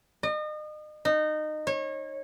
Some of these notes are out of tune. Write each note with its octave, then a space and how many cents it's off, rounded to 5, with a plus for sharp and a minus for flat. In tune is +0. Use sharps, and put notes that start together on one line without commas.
D#5 -35
D#4 -20
C#5 -30